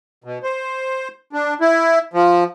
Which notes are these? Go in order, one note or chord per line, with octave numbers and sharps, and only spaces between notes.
B2
C5
D4
E4
F3